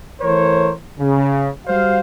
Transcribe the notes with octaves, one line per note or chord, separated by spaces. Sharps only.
E3 A3 A#4 C5 C#5
C#3
G3 F#4 C5 F5